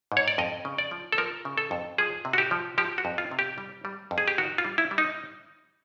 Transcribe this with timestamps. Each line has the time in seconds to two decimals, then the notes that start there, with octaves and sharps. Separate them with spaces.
0.12 G#2
0.17 C#5
0.28 D5
0.38 F2 D#5
0.65 C#3
0.78 D5
0.91 F3
1.12 A4
1.18 F3 A#4
1.45 C#3
1.58 A4
1.71 F2
1.98 F3 G#4
2.25 C3
2.33 F#4
2.38 G4
2.51 F3
2.78 F3 G4
2.98 F#4
3.05 F2
3.18 F4
3.31 C3
3.39 G4
3.58 G3
3.85 G3
4.11 F2
4.18 G#4
4.28 G4
4.38 D#3 F#4
4.58 F4
4.64 G3
4.78 E4
4.91 G3
4.98 D#4